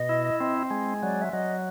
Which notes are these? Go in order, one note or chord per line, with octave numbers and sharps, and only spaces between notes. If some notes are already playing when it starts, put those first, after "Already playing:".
Already playing: B2 D#5
E4
C4
G#3
F#3 D5
E5
F#3 D#5